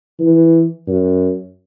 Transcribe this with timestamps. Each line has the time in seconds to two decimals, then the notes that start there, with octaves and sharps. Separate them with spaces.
0.19 E3
0.87 F#2